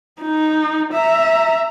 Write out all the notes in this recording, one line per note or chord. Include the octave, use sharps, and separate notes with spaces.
D#4
E5 A#5